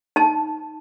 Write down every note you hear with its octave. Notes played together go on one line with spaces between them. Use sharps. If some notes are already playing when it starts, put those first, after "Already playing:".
D#4 A5